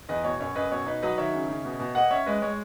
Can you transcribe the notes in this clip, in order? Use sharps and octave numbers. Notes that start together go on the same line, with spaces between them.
E2 B4 D#5
B2 C#5
F#2 C#5
F#2 B4 D#5
B2 C#5
D#4 B4
F#3 B4 D#5
D#3 C#5 E5
C#3
C#3
B2
B2
A#3 D#5 F#5
C#4 C#5 E5
G#3 B4 D#5
G#3 C#5